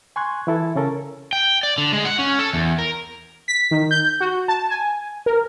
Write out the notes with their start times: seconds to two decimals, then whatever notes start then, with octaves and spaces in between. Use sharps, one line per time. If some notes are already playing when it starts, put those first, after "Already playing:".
0.16 G#5 C6 C#6 F#6 G#6
0.47 E3 E4 A4
0.75 C#3 C#4 A4 A#4
1.33 G5
1.63 D5
1.78 D3
1.93 G#3
2.05 F#5
2.19 C#4
2.39 A4
2.53 E2
2.79 A#4
3.48 B6
3.71 D#3
3.91 G6
4.20 F#4
4.48 A5
4.70 G#5
5.26 A#4